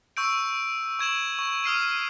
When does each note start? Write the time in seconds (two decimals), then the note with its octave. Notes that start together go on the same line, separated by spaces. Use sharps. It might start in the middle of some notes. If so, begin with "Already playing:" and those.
0.17 C#6 E6 G6 D7
0.99 C#6 G#6 E7 F#7
1.39 C#6
1.64 D#6 F6 C7 D#7